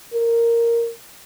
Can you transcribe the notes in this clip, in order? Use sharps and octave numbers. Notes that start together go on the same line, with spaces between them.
A#4